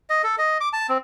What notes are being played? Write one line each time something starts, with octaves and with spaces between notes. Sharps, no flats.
D#5
A4
D#5
D6
A5
C4